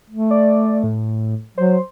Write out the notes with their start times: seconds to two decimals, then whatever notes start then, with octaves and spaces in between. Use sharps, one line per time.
0.11 A3
0.31 D5
0.83 A2
1.58 F#3 C5